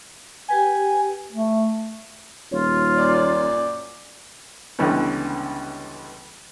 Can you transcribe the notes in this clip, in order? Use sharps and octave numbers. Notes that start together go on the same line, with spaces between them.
G4 B4 G5 G#5
A3
D#1 F4 C#5
F#2 A#2 D5
C#2 D3 E3 G3 B3 C#4